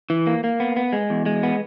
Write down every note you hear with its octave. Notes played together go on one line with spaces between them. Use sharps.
E3
A#3
A#3
B3
B3
G#3
E2
G#3
B3